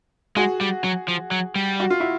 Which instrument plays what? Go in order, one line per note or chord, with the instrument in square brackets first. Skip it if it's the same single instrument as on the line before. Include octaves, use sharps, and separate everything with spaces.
[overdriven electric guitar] G#3 [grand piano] F#4 G#4
[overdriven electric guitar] G3
F#3
F3
F#3
G3
[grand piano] F#4
F4
E4 F#4